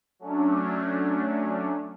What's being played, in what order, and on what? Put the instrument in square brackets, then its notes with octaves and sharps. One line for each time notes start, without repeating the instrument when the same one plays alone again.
[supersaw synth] F#3 A3 C#4 D4